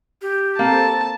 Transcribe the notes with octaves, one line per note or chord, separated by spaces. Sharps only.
G4
A#3 C4 A4 A5